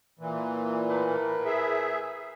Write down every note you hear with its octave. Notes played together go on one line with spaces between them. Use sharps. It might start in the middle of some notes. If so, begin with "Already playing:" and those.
A#2 E3
A2 A#4 B4
G#4 E5